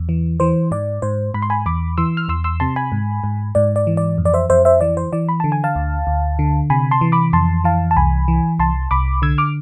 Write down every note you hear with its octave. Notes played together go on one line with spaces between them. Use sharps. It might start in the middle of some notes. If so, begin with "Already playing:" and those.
Already playing: E2
E3
E3 C5
G#2 D5
G#2 C5
G#2 B5
C6
G#5 B5
E2 B5 D6
E3 C6 E6
F6
E2 C6 E6
C6 E6
C3 A5 C6
G#5 B5
G#2
G#2
G#2 D5
D5
E3
D5
F2
D5
C5 E5
F2 C5 E5
C5 E5
E3 D5
C5
E3 D5
B5
D3 A5
G#5
F5 A5
D2
D2
D3
C3 G#5 B5
A5 C6
E3
B5 D6
F2 A5 C6
E3 F5 A5
A5
C2 G#5 B5
E3
C2 A5 C6
C2 B5 D6
D3 E6 G#6
D6 F6